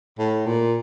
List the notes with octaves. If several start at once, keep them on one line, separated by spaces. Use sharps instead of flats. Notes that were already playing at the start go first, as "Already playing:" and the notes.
A2
A#2